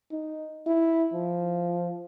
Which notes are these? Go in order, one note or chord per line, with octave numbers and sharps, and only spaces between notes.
D#4
E4
F3